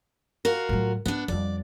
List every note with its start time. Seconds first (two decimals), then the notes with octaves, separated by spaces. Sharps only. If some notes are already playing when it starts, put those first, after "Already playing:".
0.45 F4 F#4 A#4
0.69 A2 F#3
1.06 G#2 B3 D4
1.28 F2 G3 D5